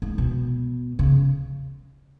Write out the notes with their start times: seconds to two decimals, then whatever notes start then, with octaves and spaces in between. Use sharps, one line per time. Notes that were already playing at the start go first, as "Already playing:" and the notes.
0.02 G#2
0.18 B2
0.99 C#3